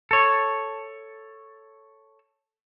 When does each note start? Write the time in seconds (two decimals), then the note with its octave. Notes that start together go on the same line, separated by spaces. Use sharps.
0.11 A4 C#5